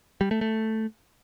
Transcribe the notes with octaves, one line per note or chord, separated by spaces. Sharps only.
G3
A3
A3